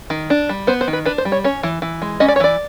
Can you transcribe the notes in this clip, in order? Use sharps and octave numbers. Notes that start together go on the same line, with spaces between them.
D#3
D4
G3
B3 C5
C5
D#3
B4
D4 B4
C5
G3
C#5
C#4 C#5
E3
E3
G#3
C#4 D#5
D5
C#5
E3 D5